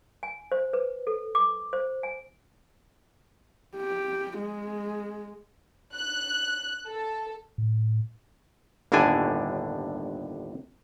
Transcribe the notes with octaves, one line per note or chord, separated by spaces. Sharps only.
G#5
C5
B4
A4
D6
C5
G#5
G4
G#3
F#6
A4
A2
G1 D#2 A2 D3 D4 G#5